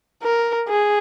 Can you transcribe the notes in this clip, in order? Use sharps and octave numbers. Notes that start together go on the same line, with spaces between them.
A#4
G#4